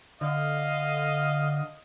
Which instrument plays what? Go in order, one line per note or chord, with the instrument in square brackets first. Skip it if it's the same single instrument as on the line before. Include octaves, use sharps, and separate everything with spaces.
[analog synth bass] D3 [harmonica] D#5 F5